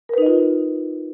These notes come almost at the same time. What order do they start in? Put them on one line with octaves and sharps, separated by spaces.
A#4 B4 D#4 D#5 F4